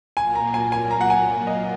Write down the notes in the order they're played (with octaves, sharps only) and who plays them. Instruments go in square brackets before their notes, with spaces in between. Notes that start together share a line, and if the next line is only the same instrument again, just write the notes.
[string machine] A#2 F#3 A#3 F4 [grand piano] G#5
[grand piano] A#5
G#5
G#5
A#5
F#5
G#5
D#5